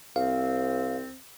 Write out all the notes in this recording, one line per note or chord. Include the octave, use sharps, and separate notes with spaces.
C2 C4 F5